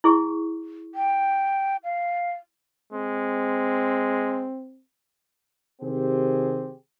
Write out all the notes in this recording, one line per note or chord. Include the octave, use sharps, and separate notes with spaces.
E4 G#4 C#6
G5
F5
G#3 C4
C3 D#3 C4 G4 G#4 C5